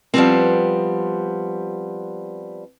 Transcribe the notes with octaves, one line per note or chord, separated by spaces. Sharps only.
F3 G3 B3 C4